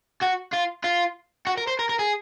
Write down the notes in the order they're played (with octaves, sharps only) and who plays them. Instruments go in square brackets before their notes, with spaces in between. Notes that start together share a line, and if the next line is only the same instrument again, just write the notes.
[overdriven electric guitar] F#4
F4
F4
F#4
A#4
C5
A#4
A#4
G#4